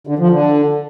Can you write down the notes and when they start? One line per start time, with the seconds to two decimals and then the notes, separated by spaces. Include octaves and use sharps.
0.07 D3
0.19 F3
0.31 D3